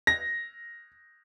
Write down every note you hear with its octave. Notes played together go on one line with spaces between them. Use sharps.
A#6